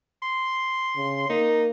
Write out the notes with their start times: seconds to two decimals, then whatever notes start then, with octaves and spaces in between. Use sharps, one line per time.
0.23 C6
0.96 C#3
1.29 A#3 D#4